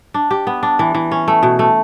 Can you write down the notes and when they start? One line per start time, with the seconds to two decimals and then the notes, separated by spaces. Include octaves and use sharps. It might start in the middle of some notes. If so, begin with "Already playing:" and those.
0.14 D4
0.31 G4
0.47 B3
0.63 D4
0.79 E3
0.95 E3
1.12 C#4
1.28 A3
1.43 B2
1.59 A3